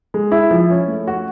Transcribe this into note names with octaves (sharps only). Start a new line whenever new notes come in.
G#3
E4
F3
C#4
A3
F#4